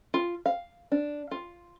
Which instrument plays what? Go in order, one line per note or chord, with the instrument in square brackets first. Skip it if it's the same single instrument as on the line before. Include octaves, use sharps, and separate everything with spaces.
[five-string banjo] F4
F5
D4
F4